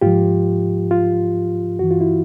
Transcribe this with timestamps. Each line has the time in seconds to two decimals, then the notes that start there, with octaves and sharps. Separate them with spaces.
0.02 G#2 F3 F4 G4
0.91 F4
1.79 G2 E3 F#4
1.91 F4
2.01 E4